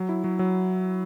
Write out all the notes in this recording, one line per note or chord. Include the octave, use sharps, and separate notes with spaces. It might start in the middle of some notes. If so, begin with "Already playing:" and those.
Already playing: F#3
E4
F#3
F#3